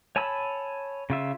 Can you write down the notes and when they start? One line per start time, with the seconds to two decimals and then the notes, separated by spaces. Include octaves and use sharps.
0.16 C#5 G#5 A5 B5 E6
1.10 C#3 F4 E5